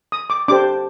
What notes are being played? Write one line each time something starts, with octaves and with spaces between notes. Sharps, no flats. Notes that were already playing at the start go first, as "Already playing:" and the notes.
D#6
D6
D4 G4 C5 D6